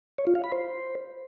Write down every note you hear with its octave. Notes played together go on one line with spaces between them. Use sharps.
C#5
F4
F5
B5
C5